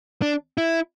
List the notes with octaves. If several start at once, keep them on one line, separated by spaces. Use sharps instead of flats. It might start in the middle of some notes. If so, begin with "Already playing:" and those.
D4
E4